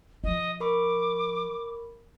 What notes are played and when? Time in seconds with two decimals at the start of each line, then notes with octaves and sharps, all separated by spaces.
0.24 F3 D#5
0.60 A#4 B5 C#6 D6